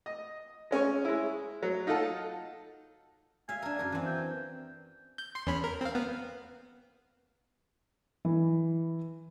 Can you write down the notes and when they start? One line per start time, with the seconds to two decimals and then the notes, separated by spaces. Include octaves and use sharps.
0.06 D#5
0.71 G#3 C#4 G#5 C#6
1.05 G#3 E4
1.63 F#3
1.87 D#4 F4 A4 F#5 A5
3.49 E5 F5 G#5
3.62 D4 A#4
3.79 F#2 A#4
3.92 E3 C4
4.06 G5
5.18 G6
5.35 C6 C7
5.47 E2 C#4 B5
5.64 A#4
5.81 C4 F5
5.95 B3
8.25 E3